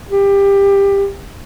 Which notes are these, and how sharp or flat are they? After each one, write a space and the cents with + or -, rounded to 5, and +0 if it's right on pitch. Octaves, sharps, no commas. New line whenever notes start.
G4 +20